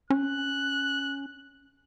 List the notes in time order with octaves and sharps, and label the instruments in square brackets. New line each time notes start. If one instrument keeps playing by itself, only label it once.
[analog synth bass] C#4 [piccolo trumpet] F#6